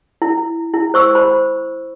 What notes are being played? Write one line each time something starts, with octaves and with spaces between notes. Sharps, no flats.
E4
E4
C5 C#6 E6
C5 B5